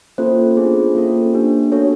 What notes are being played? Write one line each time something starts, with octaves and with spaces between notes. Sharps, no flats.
A#3 C#4 F4 A4 C5
B3 D4 F4 G#4
A#3 C#4 F4 A4
A#3 D4 G4
B3 D4 F#4 A4 C#5